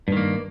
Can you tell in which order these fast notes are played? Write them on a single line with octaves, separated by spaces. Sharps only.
G2 D#3 A#3